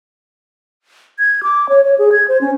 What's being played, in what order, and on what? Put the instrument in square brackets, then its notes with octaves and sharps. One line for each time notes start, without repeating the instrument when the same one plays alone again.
[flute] G#6
D6
C#5
C#5
G#4
G#6
C5
C#4